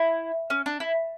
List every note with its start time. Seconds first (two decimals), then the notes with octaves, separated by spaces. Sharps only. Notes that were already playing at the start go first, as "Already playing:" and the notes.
Already playing: E4
0.50 C#4
0.66 D4
0.80 E4